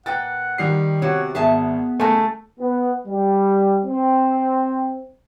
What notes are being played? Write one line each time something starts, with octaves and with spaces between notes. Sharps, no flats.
A#2 B4 F#5 G5 A6
D#3 G3 C7
C3 B3 F#4 C#5
G#1 B3 G#4 E5 A5
A#2 C#3 G#3 A3 A4 G#5
B3
G3
C4